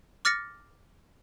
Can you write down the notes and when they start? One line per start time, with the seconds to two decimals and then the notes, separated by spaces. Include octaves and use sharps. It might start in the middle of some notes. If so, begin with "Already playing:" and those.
0.25 D6 F6 A6 A#6 C#7